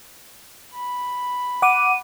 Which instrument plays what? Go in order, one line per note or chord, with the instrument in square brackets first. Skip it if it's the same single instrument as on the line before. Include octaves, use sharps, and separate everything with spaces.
[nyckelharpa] B5
[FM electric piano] F#5 D6 [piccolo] D#7